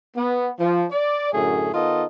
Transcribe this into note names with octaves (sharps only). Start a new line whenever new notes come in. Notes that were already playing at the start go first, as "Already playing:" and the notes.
B3
F3
D5
F#2 A2 D3 A3 G#4
D#3 B3 D#4 F4 A4 D#5